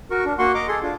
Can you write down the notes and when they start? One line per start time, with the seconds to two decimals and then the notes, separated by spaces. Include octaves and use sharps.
0.11 F#4 A#4 C#6
0.25 D4
0.39 A#3 F#4 F#5 C6 C#6
0.54 D#5 A#5 D6
0.68 G#4 A4 C6
0.83 D4 F4